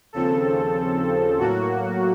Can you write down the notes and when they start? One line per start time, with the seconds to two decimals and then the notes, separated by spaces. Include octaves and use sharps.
0.13 D#2 C#3 F3 C4 A4
1.39 A2 F#3 A#3 F#4